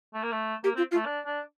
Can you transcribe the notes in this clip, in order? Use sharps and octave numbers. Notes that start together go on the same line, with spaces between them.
A3
A#3
A3
A#3 G4
C4 F4
F4
A3
D4
D4